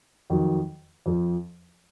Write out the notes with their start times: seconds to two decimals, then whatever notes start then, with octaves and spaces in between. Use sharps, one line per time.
0.30 F2 D#3 F#3
1.06 F2 F3